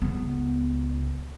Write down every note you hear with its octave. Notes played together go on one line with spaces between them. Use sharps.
C#2 B3